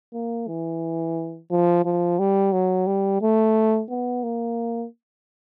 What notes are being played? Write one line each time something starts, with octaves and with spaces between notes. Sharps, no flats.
A#3
E3
F3
F3
G3
F#3
G3
A3
B3
A#3